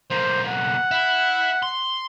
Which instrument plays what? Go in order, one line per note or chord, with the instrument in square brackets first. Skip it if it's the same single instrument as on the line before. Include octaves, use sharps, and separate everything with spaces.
[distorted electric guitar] B1 A#3 [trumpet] C5
[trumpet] F#5
[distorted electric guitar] E4 E5
C6